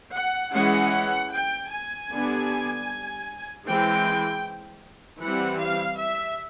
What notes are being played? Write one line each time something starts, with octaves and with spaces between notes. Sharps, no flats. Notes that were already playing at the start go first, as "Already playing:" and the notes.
F#5
E3 G#3 C#4 F#5
G5
G#5
D3 G3 B3 D4
E3 G#3 C4 G5
E3 G3 C4 F#5
F5
E5